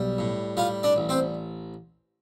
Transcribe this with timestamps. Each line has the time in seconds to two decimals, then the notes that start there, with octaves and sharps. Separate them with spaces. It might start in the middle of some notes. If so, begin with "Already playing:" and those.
Already playing: B1 G3
0.18 A2
0.57 G3 F4 F5
0.83 D4 D5
0.96 A1
1.09 C4 C5